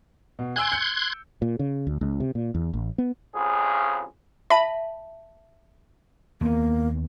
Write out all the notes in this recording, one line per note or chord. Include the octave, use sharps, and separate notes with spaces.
B2
G#5 C6 E6 F#6 G#6 D7
G6 C#7
A#2
C#3
D2
C#2
C3
A#2
E2
A1
B3
A1 F2 C#3 G#4
E5 A5 B5
D#2 A#3 B3